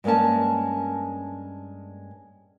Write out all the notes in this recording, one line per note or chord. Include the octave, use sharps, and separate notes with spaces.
G2 G#3 A#3 C#4 A5